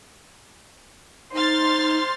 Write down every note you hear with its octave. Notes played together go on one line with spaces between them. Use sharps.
D#4 C5 C6 F6 A6